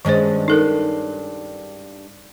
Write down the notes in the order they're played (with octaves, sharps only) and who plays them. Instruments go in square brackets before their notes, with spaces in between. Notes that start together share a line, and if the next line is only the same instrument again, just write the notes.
[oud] G2 G#3 C#4 [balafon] D#3 C5
[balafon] D#4 A4 A#4